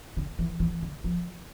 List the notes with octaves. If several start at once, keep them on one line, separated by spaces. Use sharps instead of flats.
D3
E3
E3
D3
F3